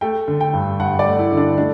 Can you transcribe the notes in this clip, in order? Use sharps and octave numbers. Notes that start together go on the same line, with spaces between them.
A3 G5
D3
G5
G2
G2 F#5
D5
A3
E4
D3
D4
A3 D4